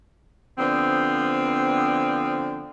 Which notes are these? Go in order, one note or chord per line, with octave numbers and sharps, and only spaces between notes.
D3 F3 B3 C4